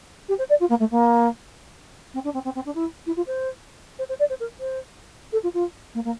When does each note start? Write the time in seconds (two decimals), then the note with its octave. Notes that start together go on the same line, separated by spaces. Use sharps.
0.28 G4
0.38 C5
0.49 D5
0.60 F4
0.69 A#3
0.79 A3
0.91 A#3
2.14 C4
2.24 D4
2.34 C4
2.45 C4
2.55 C4
2.65 D4
2.75 E4
3.06 E4
3.16 F4
3.27 C5
3.99 C5
4.09 C5
4.19 D5
4.29 C5
4.40 A#4
4.60 C5
5.32 A4
5.43 F4
5.54 F4
5.94 A#3
6.04 A#3